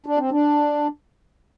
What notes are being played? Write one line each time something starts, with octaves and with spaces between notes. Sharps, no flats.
D4
C4
D4